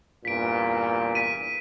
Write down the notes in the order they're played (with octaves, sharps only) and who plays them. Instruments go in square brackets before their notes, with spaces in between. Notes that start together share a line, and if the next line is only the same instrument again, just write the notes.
[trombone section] E2 G2 A#2 [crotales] B6 D7
[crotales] B6 D#7